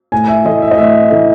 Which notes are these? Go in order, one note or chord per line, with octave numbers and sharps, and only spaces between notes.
A2 G#5
E5
E3 A3 D#5
E5
D#5
A2 E5
E3 A3